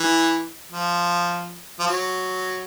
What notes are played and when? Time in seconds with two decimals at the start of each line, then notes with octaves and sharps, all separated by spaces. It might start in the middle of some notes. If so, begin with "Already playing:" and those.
Already playing: E3
0.72 F3
1.79 F3
1.87 F#3